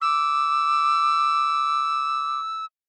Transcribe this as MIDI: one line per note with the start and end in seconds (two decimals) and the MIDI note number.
0.02 2.40 86
0.02 2.65 88